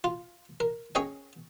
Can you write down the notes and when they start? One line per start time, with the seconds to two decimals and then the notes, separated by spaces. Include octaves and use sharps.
0.04 F4
0.60 A#4
0.95 C#4 G#4 C#5 D#5 G5